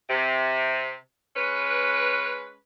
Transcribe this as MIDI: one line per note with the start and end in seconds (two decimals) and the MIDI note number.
0.09 0.94 48
1.36 2.56 56
1.36 2.56 61
1.36 2.56 71